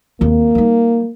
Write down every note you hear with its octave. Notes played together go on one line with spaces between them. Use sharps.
D#2 A#3 C4
G3 D#4